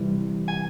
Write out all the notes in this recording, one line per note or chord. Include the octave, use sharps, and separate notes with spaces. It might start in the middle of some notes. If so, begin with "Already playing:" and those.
Already playing: C3 E3 G3
G#5